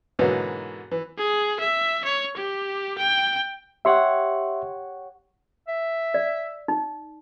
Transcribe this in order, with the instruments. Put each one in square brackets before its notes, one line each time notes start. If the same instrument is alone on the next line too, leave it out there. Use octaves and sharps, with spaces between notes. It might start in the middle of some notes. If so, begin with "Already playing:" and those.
[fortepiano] G#2 B2 D3 E3 F#3 A#3
E3
[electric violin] G#4
E5
C#5
G4
G5
[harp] G4 C#5 F#5 [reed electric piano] E5 C6
[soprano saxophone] E5
[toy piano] D5
D#4